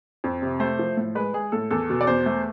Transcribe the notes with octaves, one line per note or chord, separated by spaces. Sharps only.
F2
C3
A3 C5
F3
A2
G#3 B4
G#3 G#4
A2 A4
E2 A4
B2
D5
E2 C5
A3